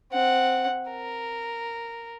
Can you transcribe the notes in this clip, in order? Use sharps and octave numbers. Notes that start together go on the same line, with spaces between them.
C4 F#5
A#4